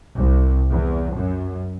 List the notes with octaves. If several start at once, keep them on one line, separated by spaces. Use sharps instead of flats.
C2
E2
F#2